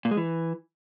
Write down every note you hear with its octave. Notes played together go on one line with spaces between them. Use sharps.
A#2
G#3
E3